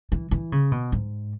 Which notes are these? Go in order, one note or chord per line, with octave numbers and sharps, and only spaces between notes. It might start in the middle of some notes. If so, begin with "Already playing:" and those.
E3
E3
C#3
B2
G#2